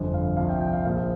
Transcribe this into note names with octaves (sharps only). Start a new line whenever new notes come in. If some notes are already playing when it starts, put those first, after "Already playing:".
Already playing: G1 F2 D3 F3
F5
C2 C3 F3 F5
G5
G5
F5
A#1 A#2 F3 F5